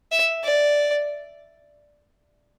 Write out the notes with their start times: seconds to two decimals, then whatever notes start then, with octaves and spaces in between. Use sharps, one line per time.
0.12 E5
0.44 D5